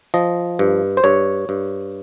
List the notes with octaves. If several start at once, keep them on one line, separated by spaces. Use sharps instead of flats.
F3 D#5
G2
C5
G2 C#5
G2